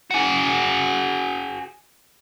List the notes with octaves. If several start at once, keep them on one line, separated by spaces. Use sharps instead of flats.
F#4 G#4